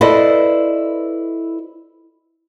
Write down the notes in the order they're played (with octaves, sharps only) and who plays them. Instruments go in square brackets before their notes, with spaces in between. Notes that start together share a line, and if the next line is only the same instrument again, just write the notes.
[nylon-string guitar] E4 A4 B4 C5 D5 D#5